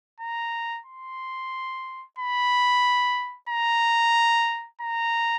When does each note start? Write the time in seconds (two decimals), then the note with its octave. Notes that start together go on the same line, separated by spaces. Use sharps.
0.20 A#5
0.86 C6
2.18 B5
3.49 A#5
4.81 A#5